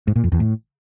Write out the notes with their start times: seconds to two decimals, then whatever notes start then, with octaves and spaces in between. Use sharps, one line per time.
0.07 G#2
0.16 A#2
0.24 F2
0.32 E2
0.40 A2